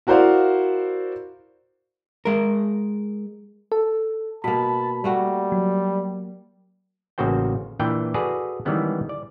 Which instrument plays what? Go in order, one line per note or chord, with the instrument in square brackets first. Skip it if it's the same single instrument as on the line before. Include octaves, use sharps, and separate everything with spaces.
[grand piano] E4 F#4 A#4 C5 D5 F5
[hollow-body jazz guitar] G#3 A#4
[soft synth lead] A4
[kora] B2 A#3 [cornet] A5 [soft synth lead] B5
[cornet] G3 [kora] A3 A#3 F#4
[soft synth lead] F#3
[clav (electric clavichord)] A1 C#3 A#3 F#4 C5 G5
A#2 E3 D4 B4 G5
F#4 G#4 A4 B4 D5
D#3 E3 G3 G#3 B3 C#4
D5